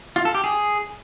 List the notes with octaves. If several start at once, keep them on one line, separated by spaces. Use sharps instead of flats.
F4
A4
G4
G#4